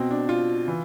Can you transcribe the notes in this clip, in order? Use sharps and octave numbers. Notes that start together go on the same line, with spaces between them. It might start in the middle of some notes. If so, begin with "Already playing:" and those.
Already playing: B2 C4
D4
F4
E3